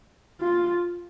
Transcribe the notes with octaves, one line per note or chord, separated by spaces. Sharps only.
F4